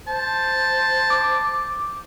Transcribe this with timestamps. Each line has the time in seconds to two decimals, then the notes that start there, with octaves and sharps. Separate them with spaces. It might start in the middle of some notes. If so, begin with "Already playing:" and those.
0.07 C5 A5
1.10 D6